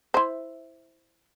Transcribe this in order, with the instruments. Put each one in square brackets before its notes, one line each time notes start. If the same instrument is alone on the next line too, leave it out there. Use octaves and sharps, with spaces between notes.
[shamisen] E4 C5